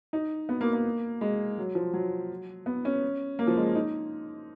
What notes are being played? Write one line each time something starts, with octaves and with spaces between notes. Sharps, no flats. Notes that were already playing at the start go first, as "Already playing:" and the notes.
D#4
B3
A#3
A#3
G#3
F#3
F3
F#3
B3
C#4
A#3
F3
G#3
D#4